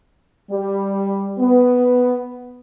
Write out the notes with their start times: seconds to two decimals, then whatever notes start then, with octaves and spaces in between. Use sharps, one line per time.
0.50 G3
1.39 B3